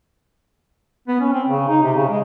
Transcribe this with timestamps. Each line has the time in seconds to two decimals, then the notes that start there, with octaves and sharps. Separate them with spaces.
1.08 B3
1.20 C#4
1.32 C4
1.47 C#3
1.68 D#4
1.82 C3
1.96 C#3
2.09 G#3